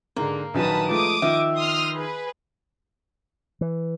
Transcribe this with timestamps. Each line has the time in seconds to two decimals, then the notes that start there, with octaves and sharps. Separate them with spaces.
0.17 G#2 D3 A#3
0.54 A#1 D#3 F#3 B4 A5 D#6
0.90 F3 G#3 A3 D6 D#6
1.22 D#3 F3 E5
1.57 C6 D#6 F6
1.94 G#4 B4
3.61 E3